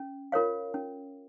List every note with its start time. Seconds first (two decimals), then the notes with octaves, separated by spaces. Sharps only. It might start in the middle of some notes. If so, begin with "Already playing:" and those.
Already playing: C#4
0.32 F4 A#4 C#5 F5
0.74 C#4